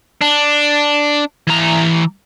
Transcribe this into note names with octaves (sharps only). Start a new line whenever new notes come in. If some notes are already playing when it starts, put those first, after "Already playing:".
D4
E3 A#5